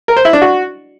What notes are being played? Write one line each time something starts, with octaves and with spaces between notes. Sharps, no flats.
A#4
C5
E4
D4
F#4